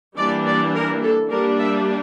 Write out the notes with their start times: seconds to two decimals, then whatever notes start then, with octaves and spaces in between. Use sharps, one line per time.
0.17 E3 G3 A#3 D4 D5
0.46 D5
0.74 A#4
1.03 A4
1.30 G3 A#3 D4 A#4
1.59 E5